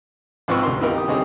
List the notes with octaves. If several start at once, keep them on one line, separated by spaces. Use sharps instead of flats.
G#2 F3 C4 B4 C#6 E6
D2 G4 A#4 C6
E3 B3 D#4 F4 G4 A#4
G4 D#6
D3 G3 C4 D#4 G#4 C#5